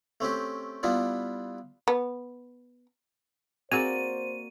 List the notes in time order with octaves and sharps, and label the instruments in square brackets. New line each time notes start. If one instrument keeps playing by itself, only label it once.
[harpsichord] A3 C4 C#4 G4
G3 B3 D4 E4 F4
[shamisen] B3
[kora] A#3 F#4 D5 [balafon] C4 G#4 [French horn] C5 [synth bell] D#7